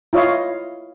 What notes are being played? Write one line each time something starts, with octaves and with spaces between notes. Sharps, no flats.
E4 F4 C#5 D#5 F5